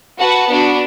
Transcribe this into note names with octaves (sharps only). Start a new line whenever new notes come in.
F#4 B4 F#5 A5
B3 D4 F#4